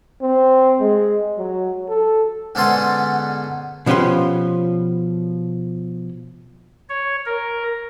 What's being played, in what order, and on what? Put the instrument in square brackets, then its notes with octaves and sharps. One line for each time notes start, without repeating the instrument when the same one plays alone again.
[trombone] C4
G#3
F#3
A4
[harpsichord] G#2 D3 B3 C#4 A4 C6
[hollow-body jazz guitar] B2 F3 C#4 G4 B4 C6
[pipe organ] C#5
A#4